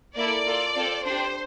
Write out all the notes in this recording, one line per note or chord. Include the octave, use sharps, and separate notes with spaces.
A#3 E4 A4 D5
A#3 F4 A4
C4 F4 A4
D4 G4 C5